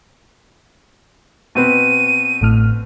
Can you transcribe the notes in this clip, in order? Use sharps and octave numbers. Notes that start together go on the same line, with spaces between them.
B2 C4 B4 D#7
A1 A2 F6